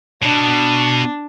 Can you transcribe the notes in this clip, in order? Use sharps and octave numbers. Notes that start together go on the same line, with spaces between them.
B2 D4